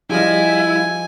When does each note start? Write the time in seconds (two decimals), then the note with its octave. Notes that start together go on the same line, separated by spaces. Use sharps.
0.10 F3 G3 E4 G#4 D#5 F5 G#5